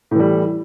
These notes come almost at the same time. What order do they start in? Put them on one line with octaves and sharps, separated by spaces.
A2 E3 G3